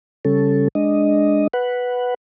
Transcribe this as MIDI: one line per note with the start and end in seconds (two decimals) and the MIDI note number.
0.25 0.68 49
0.25 0.68 55
0.25 0.68 61
0.25 0.68 69
0.75 1.47 56
0.75 1.47 62
0.75 1.47 75
1.54 2.14 71
1.54 2.14 78